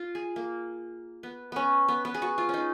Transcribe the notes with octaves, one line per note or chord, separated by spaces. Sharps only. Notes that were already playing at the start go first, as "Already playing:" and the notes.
Already playing: F4
G#4
A#3
B3
B3 C#4
B3
B3
G#4
F#4
F4
C#4 D#4